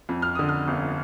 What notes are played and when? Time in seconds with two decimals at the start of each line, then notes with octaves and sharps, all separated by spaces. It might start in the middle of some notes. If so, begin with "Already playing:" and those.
0.09 F2
0.22 F6
0.35 D3 D#6
0.49 F6
0.68 G1